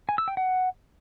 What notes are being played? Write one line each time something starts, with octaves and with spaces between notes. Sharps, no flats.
G#5
E6
G5
F#5